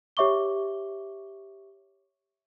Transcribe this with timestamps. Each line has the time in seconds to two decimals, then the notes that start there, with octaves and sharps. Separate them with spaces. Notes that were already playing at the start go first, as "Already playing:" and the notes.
0.17 G4 C#5 E5 C#6 D6 G7